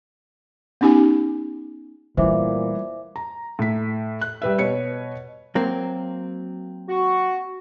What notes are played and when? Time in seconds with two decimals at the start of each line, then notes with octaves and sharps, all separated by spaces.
0.81 B3 C#4 D#4 G4 G#5
2.17 A#2 E3 G3 A3 C5 E5 D6
3.16 A#5
3.59 A2 B6
4.21 F#6
4.42 G3 B4 E5
4.59 B2 B4 C#5 C#7
5.55 F#3 A#3 C4
6.89 F#4